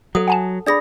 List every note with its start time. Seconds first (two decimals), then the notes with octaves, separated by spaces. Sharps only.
0.15 F#3 A4 D#6
0.28 F#5 G#5 A5
0.66 D4 G#4 D5 B5 D#6 A#6